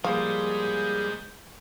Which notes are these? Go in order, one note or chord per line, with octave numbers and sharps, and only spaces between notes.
F3 G3 G#3 A#3 G#4 C5 F5